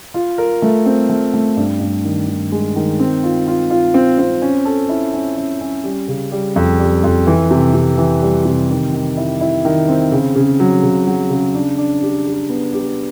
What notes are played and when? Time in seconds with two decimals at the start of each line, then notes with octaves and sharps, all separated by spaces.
0.14 F4
0.38 A#4
0.62 A3
0.86 C4
1.09 A3
1.34 A3
1.57 G2
1.80 G2
2.04 D#3
2.28 D#3
2.52 G#3
2.76 D#3
2.99 C4
3.23 F4
3.47 F4
3.70 F4
3.94 C4
4.18 C4
4.42 C#4
4.65 A4
4.89 E4
5.14 C#4
5.37 C#4
5.61 C#4
5.84 G3
6.08 C#3
6.32 G3
6.56 F2
6.80 G3
7.04 F2
7.27 E3
7.51 C3
7.74 C3
7.98 E3
8.22 G3
8.45 C3
8.69 D#3
8.93 D#3
9.17 E4
9.41 E4
9.65 D#3
9.88 C4
10.12 C#3
10.36 C#3
10.60 F#3
10.83 C#3
11.07 F#3
11.30 C#3
11.55 D4
11.78 D4
12.02 G4
12.26 G4
12.49 B3
12.73 G4